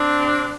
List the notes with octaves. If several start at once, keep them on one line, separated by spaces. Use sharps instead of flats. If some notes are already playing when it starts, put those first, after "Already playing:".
Already playing: C4 D4
C3